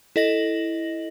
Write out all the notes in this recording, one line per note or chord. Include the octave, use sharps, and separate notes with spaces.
E4 A4 D#5 A#6 F#7